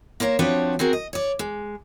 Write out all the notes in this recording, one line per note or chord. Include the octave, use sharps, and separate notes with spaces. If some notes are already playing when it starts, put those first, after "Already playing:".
A#3 C5 C#5 G5 A#5
F3 C4 D4 F#4 B4 C#5
C4 F#4 G#4 A#4
D#5
C#5 D5
G#3